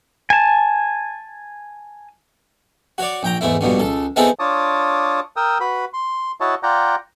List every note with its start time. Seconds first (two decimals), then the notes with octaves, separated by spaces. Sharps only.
0.30 G#5 A5
2.98 F#4 C#5 D5
3.23 A#1 G5 A#5
3.41 E2 G#2 A3 E4
3.61 A#1 G2 B2 D3
3.80 C#2 A4
4.16 B3 C4 D#4 E4 G#4 A4
4.39 D4 F4 C#5 A5 D6 D#6
5.36 A#4 G5 D#6 E6
5.60 F#4 B4 B5
5.93 C6
6.41 E4 F#4 C#5 D#5 A5
6.63 F4 D5 F#5 G5 A#5